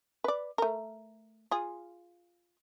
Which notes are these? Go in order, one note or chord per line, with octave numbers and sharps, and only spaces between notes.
B4 D5
A3 A#4
F4 G#4